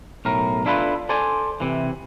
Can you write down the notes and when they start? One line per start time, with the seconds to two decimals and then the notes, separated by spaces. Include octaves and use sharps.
0.25 B1 A2 A#4
0.66 D4 E4 F4 A4 B4
1.09 A4 C5 D5 G#5
1.60 C3 E3